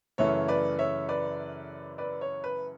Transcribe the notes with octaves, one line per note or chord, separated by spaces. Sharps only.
F#2 C#3 E3 A3 C#5
B4 D5
C#5 E5
B4 D5
B4 D5
C#5
B4